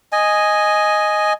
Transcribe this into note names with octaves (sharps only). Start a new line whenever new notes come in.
D#5 G#5